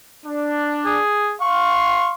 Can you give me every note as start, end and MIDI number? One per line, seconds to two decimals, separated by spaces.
0.25 1.00 62
0.85 1.33 68
1.41 2.14 77
1.41 2.14 84
1.41 2.13 85